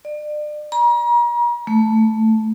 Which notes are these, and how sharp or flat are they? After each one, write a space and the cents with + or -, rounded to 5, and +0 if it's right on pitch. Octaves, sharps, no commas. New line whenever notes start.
D5 +35
A#5 +40
A3 +0